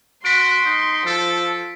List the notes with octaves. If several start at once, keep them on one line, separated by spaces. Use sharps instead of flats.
F#4 C6 B6 D7
D#4
F3 A4